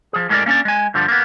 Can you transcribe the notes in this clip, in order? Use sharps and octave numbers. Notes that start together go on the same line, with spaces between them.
F3 G#4
A2 G#3 A#4 D5
A#3 C#4 D4 D5
G#3 G#5
G2 D3 F3 G3
A#3 B3